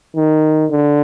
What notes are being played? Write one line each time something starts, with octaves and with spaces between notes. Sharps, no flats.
D#3
D3